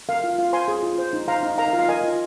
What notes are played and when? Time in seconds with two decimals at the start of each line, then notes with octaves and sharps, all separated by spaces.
0.09 A#4 F5
0.24 F4
0.38 F4 F5
0.53 C5 G#5 C6
0.68 G#4
0.83 F4
0.98 C5
1.13 D#4
1.28 C5 F5 A#5
1.43 D#4
1.58 A#4 F5 A#5
1.68 F5
1.73 F4
1.79 F5
1.89 A#4 D#5 G#5
2.04 F4